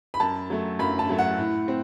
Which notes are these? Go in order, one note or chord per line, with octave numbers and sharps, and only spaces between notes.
B5
F#2 A5
F#3 A3
F#2 B5
A5
F#3 A3
F#5
A2
C4